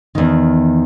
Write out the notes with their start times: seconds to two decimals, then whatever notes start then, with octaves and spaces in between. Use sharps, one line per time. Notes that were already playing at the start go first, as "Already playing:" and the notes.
0.15 E2 D#3